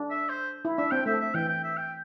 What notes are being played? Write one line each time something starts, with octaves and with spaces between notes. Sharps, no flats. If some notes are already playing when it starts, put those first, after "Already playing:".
Already playing: D4
E5
C5
E4
D4 E5
C4 G5
A3 E5
E5
E3 G5
G5
E5
G5